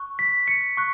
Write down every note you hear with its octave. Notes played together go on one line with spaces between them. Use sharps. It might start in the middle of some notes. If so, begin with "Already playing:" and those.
Already playing: C#6 F#6
B6
C#7
C#6 F#6